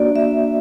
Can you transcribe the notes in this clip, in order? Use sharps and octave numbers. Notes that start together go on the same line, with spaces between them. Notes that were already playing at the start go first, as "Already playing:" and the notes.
Already playing: A#3 D4 F#4 D5
E5